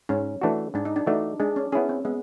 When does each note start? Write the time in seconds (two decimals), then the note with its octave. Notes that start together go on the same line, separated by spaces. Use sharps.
0.09 G#2 C#4
0.41 E3 A3 D4 F#4
0.74 G#2 D4
0.85 D#4
0.96 D4
1.07 E3 A3 D4 D#4 F#4
1.40 G#3 D4
1.56 C#4
1.72 B3 C#4 E4 G#4
1.89 C4
2.05 G#3 B3